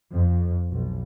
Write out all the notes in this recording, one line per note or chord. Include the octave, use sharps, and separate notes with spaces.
F2
B1